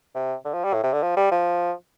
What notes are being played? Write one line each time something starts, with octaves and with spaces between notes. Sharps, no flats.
C3
D3
F3
G3
A2
C3
D3
F3
G3
F3